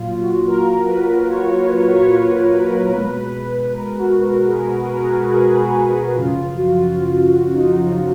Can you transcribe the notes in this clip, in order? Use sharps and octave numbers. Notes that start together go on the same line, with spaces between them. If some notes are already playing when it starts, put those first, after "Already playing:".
Already playing: A#2 F#3 F4
F#4
A#4
B4
C#5
B4
B4
C#5
B4
B2 G#3
A#4
F#4
A#4
G#4
A#4
A#4
G#4
F#4
F#2 C#3 F3 F4
F4
F#4
F4
F4
F#4
F4
D#4
F4
F4